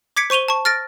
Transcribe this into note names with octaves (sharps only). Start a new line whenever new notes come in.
D6 G#6 B6 C#7 D7
C5 C#6 D#7 F7 G7
A5 C#6
F6 A6 A#6 D7